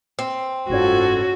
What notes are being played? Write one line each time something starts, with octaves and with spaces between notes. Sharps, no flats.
C4
F#1 G#2 C#4 F4 F#4 A4 G#6